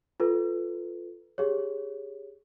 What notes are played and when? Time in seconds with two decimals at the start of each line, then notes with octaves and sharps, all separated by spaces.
0.20 F4 A4 B4
1.38 G4 G#4 C#5